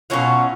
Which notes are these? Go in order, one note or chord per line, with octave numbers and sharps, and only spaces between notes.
B2 F#3 C#4 F4